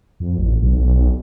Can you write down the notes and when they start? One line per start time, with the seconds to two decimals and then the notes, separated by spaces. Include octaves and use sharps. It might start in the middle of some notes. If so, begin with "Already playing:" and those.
0.20 F2
0.38 A1
0.62 B1